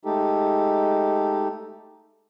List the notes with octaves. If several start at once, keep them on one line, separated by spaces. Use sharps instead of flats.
G#3 A3 D#4 G4 A4